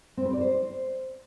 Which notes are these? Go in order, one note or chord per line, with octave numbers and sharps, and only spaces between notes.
C4
B4
D5
C5